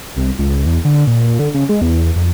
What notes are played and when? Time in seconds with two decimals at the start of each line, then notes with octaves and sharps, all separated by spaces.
0.16 C2
0.39 C#2
0.66 E2
0.85 D3
1.07 A#2
1.39 D3
1.54 C#3
1.69 G#3
1.82 E2
2.16 F2